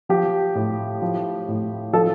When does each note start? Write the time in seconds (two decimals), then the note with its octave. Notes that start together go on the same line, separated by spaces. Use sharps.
0.09 F3 G4
0.55 A2
1.02 F3
1.48 A2
1.93 F3 A4